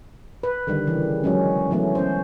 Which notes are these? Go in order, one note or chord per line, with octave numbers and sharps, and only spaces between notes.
B4
D3 D#3 G3
C#3 E3
F#3 G#3 C#4
E3 F#3 A3 B3 C#4
C#4 C5